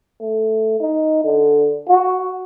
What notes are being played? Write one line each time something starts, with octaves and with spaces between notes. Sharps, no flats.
A3
D#4
D3
F#4